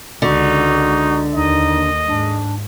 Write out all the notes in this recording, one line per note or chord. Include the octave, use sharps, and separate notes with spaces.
C#2 D3 D#4 F#4
D#2 D#4 D#5
G#2 D4